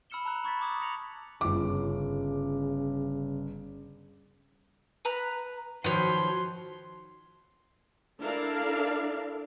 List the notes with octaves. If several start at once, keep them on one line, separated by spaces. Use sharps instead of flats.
B5 E6 F6 C#7 E7 G7
A5 A#5 E6 F#6 F#7
B5 C#6 G#6 A6 B6
A5 A#5 D6 D#6 G#6
D6 A#6 C#7 F7 F#7
G1 C#3 D6
B4 A#5 F#6
D#3 F3 F#3 B4 C#5 C6
D4 E4 A4 A#4 D5 F5